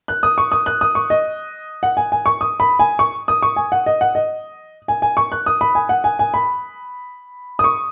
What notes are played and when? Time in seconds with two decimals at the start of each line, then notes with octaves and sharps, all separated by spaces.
0.08 F#6
0.23 D#6
0.38 C#6
0.52 D#6
0.66 F#6
0.81 D#6
0.95 C#6
1.10 D#5
1.83 F#5
1.97 G#5
2.12 G#5
2.26 C#6
2.41 D#6
2.60 B5
2.79 G#5
2.99 C#6
3.28 D#6
3.43 C#6
3.56 G#5
3.72 F#5
3.86 D#5
4.01 F#5
4.15 D#5
4.88 G#5
5.02 G#5
5.17 C#6
5.32 F#6
5.46 D#6
5.61 B5
5.75 G#5
5.89 F#5
6.04 G#5
6.19 G#5
6.34 B5
7.59 D#6
7.64 C#6